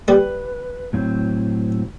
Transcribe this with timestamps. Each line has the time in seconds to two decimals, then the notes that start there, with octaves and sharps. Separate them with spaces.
0.08 G3 B4
0.93 A2 F#3 C4